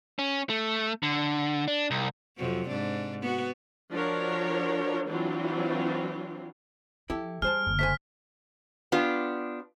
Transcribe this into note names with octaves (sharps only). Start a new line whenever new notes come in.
C#4
A3
D3
D4
C2
F2 C3 F#3
G#2 D4
B3 F#4
F3 D4 F#4 A#4 C#5
E3 F#3 C4 D4 F4
F3 E4 G4 A4
G3 G#4 C5 A5 F6
F#1 D3
A3 C5 G#5 B6
B3 D4 F4 G4